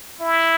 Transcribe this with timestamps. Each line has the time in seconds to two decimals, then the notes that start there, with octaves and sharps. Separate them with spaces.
0.20 E4